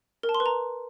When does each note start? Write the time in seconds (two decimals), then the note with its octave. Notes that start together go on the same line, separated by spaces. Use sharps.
0.23 A#4
0.29 A5
0.35 C6
0.40 B4
0.46 A#5